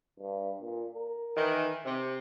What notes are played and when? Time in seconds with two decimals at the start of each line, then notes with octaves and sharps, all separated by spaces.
0.19 G2
0.61 A#2
0.94 A#4
1.36 D#3 E3
1.85 C3